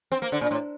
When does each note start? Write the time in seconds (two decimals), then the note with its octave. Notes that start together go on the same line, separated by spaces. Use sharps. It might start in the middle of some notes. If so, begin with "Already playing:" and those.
0.12 C4
0.22 A#3
0.32 D3
0.41 A#2
0.51 A2